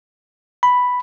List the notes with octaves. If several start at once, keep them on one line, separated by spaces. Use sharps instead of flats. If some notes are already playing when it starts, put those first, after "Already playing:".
B5